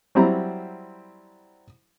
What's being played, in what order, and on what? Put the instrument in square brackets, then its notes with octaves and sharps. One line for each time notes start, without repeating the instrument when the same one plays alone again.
[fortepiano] F#3 G3 C4 E4 A#5 B5